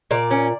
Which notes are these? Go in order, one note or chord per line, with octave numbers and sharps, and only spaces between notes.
A#2 D5
C#4